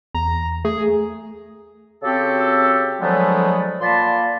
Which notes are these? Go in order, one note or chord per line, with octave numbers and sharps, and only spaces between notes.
E2 A#5
A3 G#4
C#3 C4 F#4 G4 A4
D3 F3 F#3 G#3 A3 B3
A#2 A#3 D5 A5 B5 C6